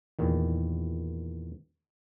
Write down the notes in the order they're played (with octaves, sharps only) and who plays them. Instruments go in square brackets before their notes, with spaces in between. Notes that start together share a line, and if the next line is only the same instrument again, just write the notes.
[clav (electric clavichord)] E2 A#2 D#3